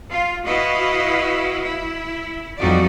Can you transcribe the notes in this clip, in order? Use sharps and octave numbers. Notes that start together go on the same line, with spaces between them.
F4
E4 F#4 B4 D#5 F5
E4
F2 F#3 G3 D#4 F#4 D5